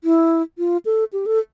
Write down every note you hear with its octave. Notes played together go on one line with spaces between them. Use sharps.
E4
F4
A4
G4
A4